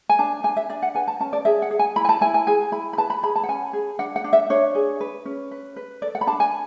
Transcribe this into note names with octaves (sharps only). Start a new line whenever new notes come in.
G#5
D4 A5
D4 G#5
E5
D4 D5
F#5
B4 G#5
A5
C#4 A5
D5
G#4 E5
F#5
G#4
G#5
E4 B5
G#5
A5
E4 G#5
G#5
G#4 G#5
E4 B5
B5
B4 A5
B5
G#4 B5
A5
F#5
C#4 G#5
G#4
D4 F#5
F#5
D4
E5
D4 C#5
G#4
B4
C#4
B4
B4
A4 D5
F#5
B5
D4 A5
G#5